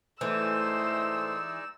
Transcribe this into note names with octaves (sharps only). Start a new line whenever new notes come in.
A2 E3 G#3 A3 D#4 C5 D5 E6